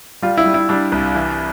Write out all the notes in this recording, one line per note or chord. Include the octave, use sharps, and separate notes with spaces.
G3 F4
E4
G3
E4
G3 D4
C2
E3